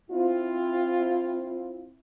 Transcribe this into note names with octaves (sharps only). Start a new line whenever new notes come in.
C4 E4 F4